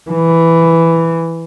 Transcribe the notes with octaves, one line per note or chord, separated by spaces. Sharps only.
E3